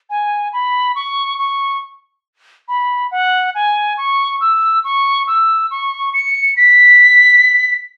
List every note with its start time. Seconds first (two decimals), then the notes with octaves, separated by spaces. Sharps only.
0.10 G#5
0.53 B5
0.96 C#6
1.39 C#6
2.68 B5
3.11 F#5
3.55 G#5
3.98 C#6
4.41 E6
4.84 C#6
5.27 E6
5.71 C#6
6.13 C#7
6.57 B6